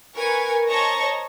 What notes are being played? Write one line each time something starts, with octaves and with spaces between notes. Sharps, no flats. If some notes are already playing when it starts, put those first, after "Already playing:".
A#4 B4 G#5 C#6
C5 C#5 D#5 A5 A#5 C#6